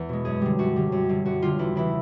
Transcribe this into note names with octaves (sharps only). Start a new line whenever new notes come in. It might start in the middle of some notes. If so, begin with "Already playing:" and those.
Already playing: E2
B2 G#3
F#2 G#4
D3 G3
F#2 F#4
D3 G3
F#2
D3 G3
F#2 F#4
D3 G3 F4
E2 E4
C#3 E3 E4